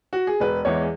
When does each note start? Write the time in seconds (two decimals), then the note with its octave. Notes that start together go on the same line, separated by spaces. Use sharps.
0.13 F#4
0.27 G#4
0.40 E1 B4
0.65 E2 E3 G#3 C#5